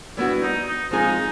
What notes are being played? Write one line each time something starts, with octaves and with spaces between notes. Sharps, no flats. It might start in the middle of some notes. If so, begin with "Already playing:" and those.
G3 B3 D4 E4 F#4
D#4
D#4
F3 G#3 C4 D#4 F4 G#4